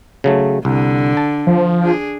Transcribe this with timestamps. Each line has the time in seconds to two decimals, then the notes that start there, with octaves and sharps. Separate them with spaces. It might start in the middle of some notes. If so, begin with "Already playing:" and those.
0.24 C#3 F#3 A3
0.65 C2 D3
1.17 A5
1.47 F3
1.81 D4 G#4